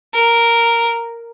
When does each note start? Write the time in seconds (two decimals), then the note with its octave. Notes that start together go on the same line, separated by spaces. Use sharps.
0.14 A#4